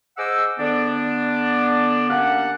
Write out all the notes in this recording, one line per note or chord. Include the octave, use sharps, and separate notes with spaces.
G#4 C5 D#5 F#5 D6 E6
D3 B3 D4
A#3 C#4 D4 G4 F5 F#5